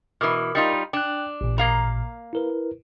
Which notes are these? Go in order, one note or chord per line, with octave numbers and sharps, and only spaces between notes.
B2 E3 A#4 D6 F6
G3 D#4 F4
D4 G5 F#6
A1 A#2
A#3 F5 A#5
E4 A#4 B4